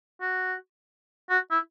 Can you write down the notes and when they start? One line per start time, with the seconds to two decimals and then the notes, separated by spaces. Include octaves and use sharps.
0.21 F#4
1.30 F#4
1.51 E4